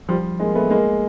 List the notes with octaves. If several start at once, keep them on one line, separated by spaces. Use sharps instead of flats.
F3 G3
G#3 A#3
A3 B3
G#3 A#3